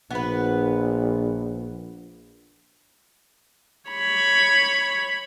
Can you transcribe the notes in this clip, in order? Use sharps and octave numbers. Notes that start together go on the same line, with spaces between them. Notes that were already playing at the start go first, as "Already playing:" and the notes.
A#1 B3 B4
C#5 B5